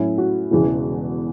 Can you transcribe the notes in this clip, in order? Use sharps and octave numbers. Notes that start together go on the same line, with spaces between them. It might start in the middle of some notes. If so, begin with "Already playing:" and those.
Already playing: A2 F#3 C#4 E4
F#4
E1 E2 C#3 E3